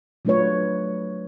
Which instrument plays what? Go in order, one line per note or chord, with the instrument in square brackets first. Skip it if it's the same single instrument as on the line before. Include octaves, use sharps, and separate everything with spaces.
[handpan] F#3 A3 D4 F4 B4 C#5